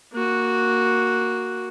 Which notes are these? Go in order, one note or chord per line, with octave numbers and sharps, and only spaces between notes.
A#3 F#4